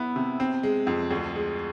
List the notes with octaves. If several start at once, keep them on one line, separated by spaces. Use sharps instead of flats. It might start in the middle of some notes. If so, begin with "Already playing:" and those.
Already playing: B3 E4
C3
C4
G#3
F2
D2
G#3